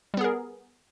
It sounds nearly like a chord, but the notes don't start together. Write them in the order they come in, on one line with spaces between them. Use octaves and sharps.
G3 B3 G#4 A#4